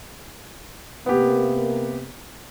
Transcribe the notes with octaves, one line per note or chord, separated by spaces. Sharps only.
C3 A#3 B3 G4